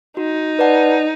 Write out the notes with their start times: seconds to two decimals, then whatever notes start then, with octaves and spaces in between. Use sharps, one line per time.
0.17 D#4 F#4
0.59 B4 D5 F#5 A5